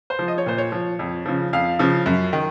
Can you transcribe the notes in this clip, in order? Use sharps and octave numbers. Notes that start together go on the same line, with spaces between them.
C5
F3
D#5
C#5
A#2 C5
C#5
F3
F2
C#3 F3
F2 F5
C#3 F3
F#2
D#3